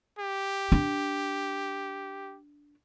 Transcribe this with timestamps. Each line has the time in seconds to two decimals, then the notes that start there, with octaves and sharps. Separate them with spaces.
0.19 G4
0.72 D4